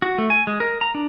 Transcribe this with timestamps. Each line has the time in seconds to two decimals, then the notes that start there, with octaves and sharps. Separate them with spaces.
0.02 F#4
0.18 A3
0.30 G#5
0.47 G#3
0.60 A#4
0.81 A#5
0.95 D4